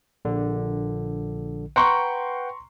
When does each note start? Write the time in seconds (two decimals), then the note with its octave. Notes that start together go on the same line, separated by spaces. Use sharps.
0.25 A#1 D3
1.76 B4 F#5 G5 A#5 C6 C#6